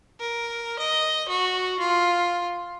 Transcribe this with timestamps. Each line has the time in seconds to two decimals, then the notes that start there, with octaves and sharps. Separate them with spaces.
0.20 A#4
0.79 D#5
1.29 F#4
1.79 F4